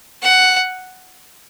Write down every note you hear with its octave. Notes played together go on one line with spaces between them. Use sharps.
F#5